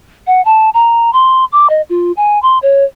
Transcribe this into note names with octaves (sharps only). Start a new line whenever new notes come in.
F#5
A5
A#5
C6
D6
D#5
F4
G#5
C6
C#5